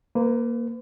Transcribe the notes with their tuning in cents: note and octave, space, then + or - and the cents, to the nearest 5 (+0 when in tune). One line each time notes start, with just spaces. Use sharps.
A#3 +0 B4 +40